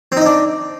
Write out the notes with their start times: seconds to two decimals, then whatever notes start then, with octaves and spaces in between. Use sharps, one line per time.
0.12 C4
0.17 D#4
0.21 D#5
0.26 D4